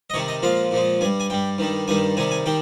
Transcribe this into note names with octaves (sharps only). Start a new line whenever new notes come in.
D#5
C3 D#3 G3 C#5
D#5
A#2 F3 G#3 F5
A#2 F3 G#3
G2 G3 G#5
G#5
G2 G3 G5
G2 D#3 G3
G2 D#3 G3 G#5
C3 D#3 G3 G#5
G#5
D#3 G3 G5